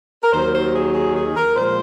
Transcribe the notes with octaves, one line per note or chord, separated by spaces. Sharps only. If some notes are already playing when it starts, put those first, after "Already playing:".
A#4
D#2 D#3 F#3 C5
C5
G#4
G#4
G#4
A#4
A#2 F3 G#3 C5